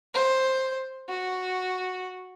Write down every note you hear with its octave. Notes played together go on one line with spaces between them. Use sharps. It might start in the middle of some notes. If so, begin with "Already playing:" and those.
C5
F#4